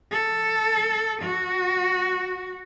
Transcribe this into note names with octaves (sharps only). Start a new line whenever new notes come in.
A4
F#4